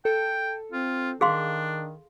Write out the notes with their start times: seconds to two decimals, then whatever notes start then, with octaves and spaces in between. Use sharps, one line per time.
0.05 A4 G5
0.72 C4 F4
1.21 D#3 D4 G#4 F5 C6